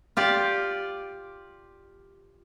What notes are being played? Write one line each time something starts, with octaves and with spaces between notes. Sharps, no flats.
F4 G4 D5